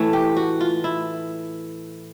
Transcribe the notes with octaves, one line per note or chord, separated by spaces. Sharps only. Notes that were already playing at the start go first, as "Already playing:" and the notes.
Already playing: A2 E3 A3
G4
F#4
F4
E4